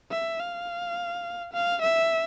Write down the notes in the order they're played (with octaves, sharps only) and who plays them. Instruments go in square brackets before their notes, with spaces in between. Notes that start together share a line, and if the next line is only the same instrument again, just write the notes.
[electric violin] E5
F5
F5
E5